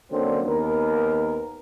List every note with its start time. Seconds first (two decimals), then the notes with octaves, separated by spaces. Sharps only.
0.11 D3 F#3 A#3 C4 C#4
0.45 D#2 B3 A#4